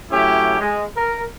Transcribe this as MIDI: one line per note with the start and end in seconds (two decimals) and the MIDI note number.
0.11 0.57 54
0.11 0.57 57
0.11 0.57 61
0.11 0.57 64
0.11 0.57 67
0.59 0.82 56
0.96 1.22 70